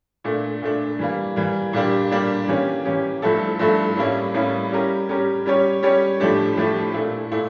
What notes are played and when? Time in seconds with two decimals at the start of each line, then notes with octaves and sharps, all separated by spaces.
0.24 A#2 A3 D4
0.62 A#2 A3 D4
0.99 E3 G3 A#3
1.36 E3 G3 A#3
1.73 A#2 G3 A#3 D4 G4
2.11 A#2 G3 A#3 D4 G4
2.48 E3 A#3 C#4 G4
2.85 E3 A#3 C#4 G4
3.22 G2 F3 A3 E4 A4
3.59 G2 F3 A3 E4 A4
3.97 A2 G3 A#3 C#4 E4
4.34 A2 G3 A#3 C#4 E4
4.71 G3 C#4 G4 A#4
5.09 G3 C#4 G4 A#4
5.46 G3 C#4 G4 C#5
5.83 G3 C#4 G4 C#5
6.20 A2 F3 A3 D4 G4
6.57 A2 F3 A3 D4 G4
6.94 A#2 A3 E4
7.31 A#2 A3 E4